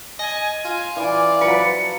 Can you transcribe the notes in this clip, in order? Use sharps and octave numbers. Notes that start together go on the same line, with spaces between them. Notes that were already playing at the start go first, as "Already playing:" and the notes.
D#5 G#5
F4
E3 D5 D6
F3 F#3 B4 C#7